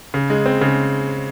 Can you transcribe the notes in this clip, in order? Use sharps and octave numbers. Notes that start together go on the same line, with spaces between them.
C#3
G#3
C4
C#3